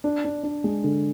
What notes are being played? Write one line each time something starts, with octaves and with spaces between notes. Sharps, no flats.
D4
D4
D4
G#3
D3